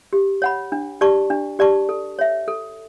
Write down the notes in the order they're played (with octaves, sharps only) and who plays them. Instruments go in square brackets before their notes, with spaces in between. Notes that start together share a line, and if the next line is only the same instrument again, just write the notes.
[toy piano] G4
C#5 F#5 B5
D4
G4 D5 A5 C#6
D4
G4 D5 A5 C#6
A4
C#5 E5
A4